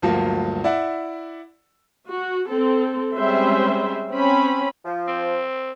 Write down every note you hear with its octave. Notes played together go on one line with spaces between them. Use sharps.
D2 G2 F3 F#3 A#3
E4 D5 E5 F#5
F#4
C4 A4
G3 G#3 C4 C#4 C5 E5
C4 C#4 B5
F3
C4